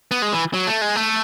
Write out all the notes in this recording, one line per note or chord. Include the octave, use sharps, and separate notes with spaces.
B3
G#3
E3
F#3
A3
G#3
A3